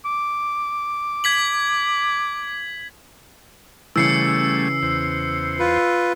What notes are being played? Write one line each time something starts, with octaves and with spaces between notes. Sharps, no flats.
D6
G#6 B6 F#7
C#3 E3 G3 A3 C#4 E6 C7 C#7
E2 C5
F4 B4